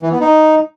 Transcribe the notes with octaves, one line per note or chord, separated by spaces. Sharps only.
E3
B3
D#4